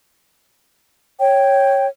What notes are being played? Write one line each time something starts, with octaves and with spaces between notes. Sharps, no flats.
C#5 G5